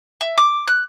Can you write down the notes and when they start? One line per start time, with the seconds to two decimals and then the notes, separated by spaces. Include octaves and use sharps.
0.21 E5
0.38 D6
0.68 F#6